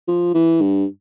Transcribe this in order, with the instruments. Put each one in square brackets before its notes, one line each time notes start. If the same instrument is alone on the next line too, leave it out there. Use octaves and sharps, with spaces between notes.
[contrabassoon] F3
E3
G2